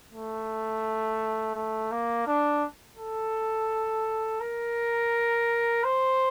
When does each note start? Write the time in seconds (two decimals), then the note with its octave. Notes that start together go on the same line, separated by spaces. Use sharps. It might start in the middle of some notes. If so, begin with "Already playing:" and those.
0.13 A3
1.55 A3
1.91 A#3
2.27 D4
2.98 A4
4.41 A#4
5.84 C5